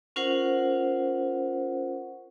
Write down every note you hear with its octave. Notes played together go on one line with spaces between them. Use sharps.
C#4 F4 A#4 C5 F#5